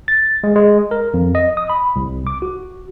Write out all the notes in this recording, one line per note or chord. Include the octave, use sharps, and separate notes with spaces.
A6
G#3
G#3
A#4
F2
D#5
D#6
B5
C2
D6
F#4